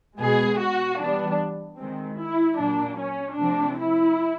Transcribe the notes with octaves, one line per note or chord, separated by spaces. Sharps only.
B2 G#3 B3 G#4
F#4
E3 G3 B3 D4
D#3 G#3 C4
E4
A#2 F#3 A#3 D4
C#4
C3 F3 A3 C4 D4
E4